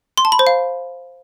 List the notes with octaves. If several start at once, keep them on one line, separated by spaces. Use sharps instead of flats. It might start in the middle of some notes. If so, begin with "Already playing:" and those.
C6
A5
B5
C5
F5